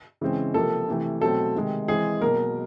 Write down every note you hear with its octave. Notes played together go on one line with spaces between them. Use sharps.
C#3 E3 G#3 C4
C3 F3 A#3 A4
C3 E3 A3
B2 F#3 A3 C4 A4
C3 D#3 G#3
E3 G#3 C4 G#4
B2 F#3 A#3 A#4